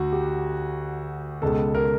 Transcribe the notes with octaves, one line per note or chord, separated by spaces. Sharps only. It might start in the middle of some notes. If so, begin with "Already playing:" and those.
Already playing: D2 F#4
G4
C#2 B2 G#3 A4
A#4